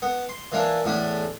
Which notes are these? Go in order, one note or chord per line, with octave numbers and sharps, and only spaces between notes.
B3
C6
E3 A#3 D4 E4
E2 A2 D4 B5